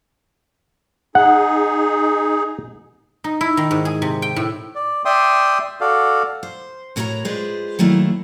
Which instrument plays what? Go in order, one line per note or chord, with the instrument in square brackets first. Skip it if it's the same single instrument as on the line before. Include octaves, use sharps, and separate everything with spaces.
[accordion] D#4 G#4 [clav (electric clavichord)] F#5
[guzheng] D#4
E4
D#3
G#2
G#4
C3
G5
A2
[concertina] D5
D5 E5 G5 C6 D#6
F#4 A4 D5 F5
[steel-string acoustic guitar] C5
A2 F#4 A#4 C#5 D#5 A#5
G#3 F4 G#4 B4 C5 D5
D#3 F#3 A3 A#3 E4